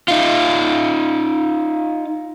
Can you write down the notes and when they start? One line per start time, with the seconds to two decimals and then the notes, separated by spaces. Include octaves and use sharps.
0.08 D#4 F4